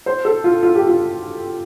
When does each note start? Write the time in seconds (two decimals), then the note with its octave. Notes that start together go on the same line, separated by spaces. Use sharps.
0.06 C5
0.25 A4
0.44 F4
0.63 F4
0.75 G4
0.87 F4